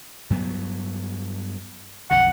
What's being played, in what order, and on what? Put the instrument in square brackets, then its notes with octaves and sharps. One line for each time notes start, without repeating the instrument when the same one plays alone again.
[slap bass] G2 F#3 B3
[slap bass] B1 F2 D3 [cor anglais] F#5